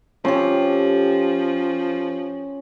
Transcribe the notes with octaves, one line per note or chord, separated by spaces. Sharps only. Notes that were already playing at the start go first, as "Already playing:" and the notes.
F3 C#4 G4 A4 C6